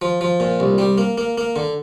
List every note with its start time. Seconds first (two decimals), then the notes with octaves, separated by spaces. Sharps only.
0.02 F3
0.21 F3
0.40 A#2
0.60 C2
0.78 G3
0.98 A#3
1.18 A#3
1.38 A#3
1.56 D3